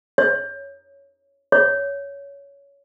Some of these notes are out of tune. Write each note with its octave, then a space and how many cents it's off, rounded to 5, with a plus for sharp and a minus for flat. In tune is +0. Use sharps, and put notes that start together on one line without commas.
C#5 +0
C#5 +15